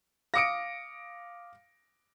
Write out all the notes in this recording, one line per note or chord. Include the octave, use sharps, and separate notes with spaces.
F5 D6 D#6 A#6 C#7 D7